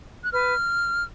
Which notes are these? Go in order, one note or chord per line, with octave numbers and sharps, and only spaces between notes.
F#6
B4 F6